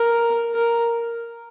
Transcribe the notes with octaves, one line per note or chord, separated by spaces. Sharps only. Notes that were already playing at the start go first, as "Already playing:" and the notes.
Already playing: A#4
A#4